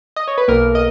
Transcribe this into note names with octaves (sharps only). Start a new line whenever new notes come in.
D#5
C#5
B4
B1 B2 A#3 A#4
D#5